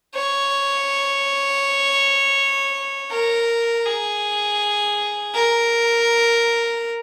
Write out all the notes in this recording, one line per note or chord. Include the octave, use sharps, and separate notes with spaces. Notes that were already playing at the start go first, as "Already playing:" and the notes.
C#5
A#4
G#4
A#4